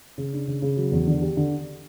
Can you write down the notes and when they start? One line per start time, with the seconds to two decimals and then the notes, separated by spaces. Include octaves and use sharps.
0.18 C#3
0.33 D4
0.48 C#3
0.62 C#3
0.77 F#3
0.92 E2
1.07 D3
1.22 G4
1.37 D3